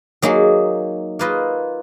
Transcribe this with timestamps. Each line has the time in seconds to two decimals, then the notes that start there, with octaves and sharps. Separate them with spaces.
0.22 F#3 A#3 D#4 G#4
1.19 A#3 F4 B4 D#5